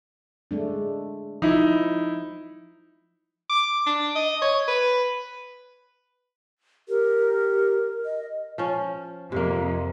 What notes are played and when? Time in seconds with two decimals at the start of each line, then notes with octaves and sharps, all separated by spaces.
0.51 G#3 A3 D4
1.42 F3 D#4 E4
3.50 D6
3.86 D4
4.16 D#5
4.42 C#5
4.68 B4
6.89 G4 A#4
8.05 D#5
8.58 F3 C#4
9.32 F2 C3 A#3